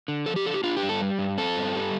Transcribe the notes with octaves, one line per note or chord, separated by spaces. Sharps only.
D3
F3 A4
G4
D3 A4
G4
D4 F4
G4
G2
A4
G3
G2
C4 A4
G2
G3